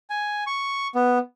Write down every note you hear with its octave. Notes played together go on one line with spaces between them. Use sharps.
G#5
C#6
B3